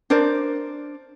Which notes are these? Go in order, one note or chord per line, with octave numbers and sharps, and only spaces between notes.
D4 A#4 C5 D5